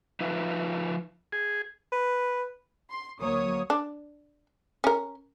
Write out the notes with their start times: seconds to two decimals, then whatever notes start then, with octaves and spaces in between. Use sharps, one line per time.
0.20 F3 D#4 F4 B4 E5
1.32 G#4
1.92 B4
2.90 C6
3.20 D2 F#3 A#3 C#5 D#6
3.70 D4
4.84 C#4 A#4